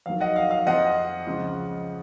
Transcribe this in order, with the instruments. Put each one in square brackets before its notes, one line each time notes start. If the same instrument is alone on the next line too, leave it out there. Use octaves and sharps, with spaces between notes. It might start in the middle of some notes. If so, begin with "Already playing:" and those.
[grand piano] F2 D#3 F#3 F5
D#5 F#5
F5
F5
F2 F3 D#5 F#5
C#2 C#3 F3